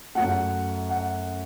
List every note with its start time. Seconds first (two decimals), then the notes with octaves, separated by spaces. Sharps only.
0.15 F#2 F#3 A3 F#5
0.89 F#5